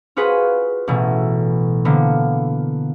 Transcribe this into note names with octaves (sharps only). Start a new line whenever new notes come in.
F4 F#4 G#4 B4
A1 B2 E3
D3 A#3 B3